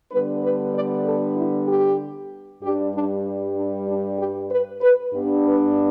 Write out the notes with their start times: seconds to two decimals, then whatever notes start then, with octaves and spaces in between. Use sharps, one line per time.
0.12 D3 G3 B3 D4 B4
0.43 B4
0.74 D5
1.05 A4
1.36 E4
1.68 G4
2.62 G2 G3 D4 G4
2.94 D4
3.57 D4
3.88 D4
4.18 G4
4.51 B4
4.82 B4
5.13 G2 G3 B3 D4
5.44 B4